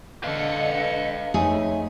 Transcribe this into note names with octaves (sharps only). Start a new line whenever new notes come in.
D3 B4 D#5 F5 C#7
F2 A3 D#4 G#4 C#5